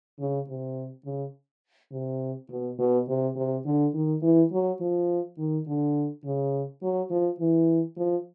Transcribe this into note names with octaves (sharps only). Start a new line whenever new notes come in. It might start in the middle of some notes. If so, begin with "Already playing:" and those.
C#3
C3
C#3
C3
B2
B2
C3
C3
D3
D#3
E3
F#3
F3
D#3
D3
C#3
F#3
F3
E3
F3